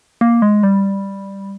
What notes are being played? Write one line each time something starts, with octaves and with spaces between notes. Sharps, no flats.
A#3
G#3
G3